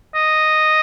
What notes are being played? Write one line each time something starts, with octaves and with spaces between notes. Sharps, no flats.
D#5